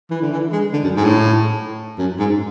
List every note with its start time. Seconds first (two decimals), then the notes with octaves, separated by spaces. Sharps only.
0.10 E3
0.22 D3
0.31 E3
0.52 G#3
0.73 D3
0.83 F#2
0.96 G#2
1.04 A2
1.98 F#2
2.19 G#2